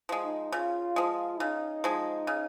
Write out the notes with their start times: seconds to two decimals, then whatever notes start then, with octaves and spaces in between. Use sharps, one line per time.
0.09 F3 G#3
0.24 D#4
0.52 C#3 F4
0.96 F3 G#3
1.39 C#3 D#4
1.84 F3 G#3
2.27 C#3